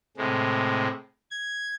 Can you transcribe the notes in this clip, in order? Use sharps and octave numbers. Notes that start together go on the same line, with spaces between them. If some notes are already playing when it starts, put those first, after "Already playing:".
A2 C3 G#3
G#6